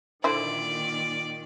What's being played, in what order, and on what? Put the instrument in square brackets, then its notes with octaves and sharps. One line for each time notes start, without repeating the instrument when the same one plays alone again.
[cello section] A#2 D#3 [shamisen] D3 E4 C5 [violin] D5